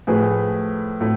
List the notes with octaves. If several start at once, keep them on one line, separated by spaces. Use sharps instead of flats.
A2 F3 A3 G#4 B4
A2 F3 A3